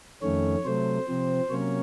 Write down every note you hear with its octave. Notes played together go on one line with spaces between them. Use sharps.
F2 D#3 A3 C#4 C#5
C3 F#3 A3 C5
C3 F3 C4
C3 F#3 A#3 C#4 C#5